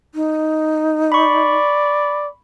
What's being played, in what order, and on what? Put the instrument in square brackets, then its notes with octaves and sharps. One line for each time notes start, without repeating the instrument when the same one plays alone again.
[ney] D#4
[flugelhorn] D5 [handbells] B5 C#6